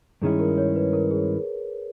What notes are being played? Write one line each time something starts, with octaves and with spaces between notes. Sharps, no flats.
G2 D#3 G#3 C#4 E4 G#4
A#4
C#5
B4
A#4
G#4